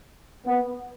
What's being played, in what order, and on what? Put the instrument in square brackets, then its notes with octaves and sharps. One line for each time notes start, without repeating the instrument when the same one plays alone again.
[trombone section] B3